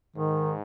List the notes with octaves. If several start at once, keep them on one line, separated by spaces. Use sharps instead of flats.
G#2 D#3